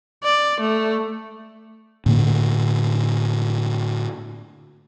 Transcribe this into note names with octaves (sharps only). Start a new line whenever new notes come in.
D5
A3
A2 D3 A#3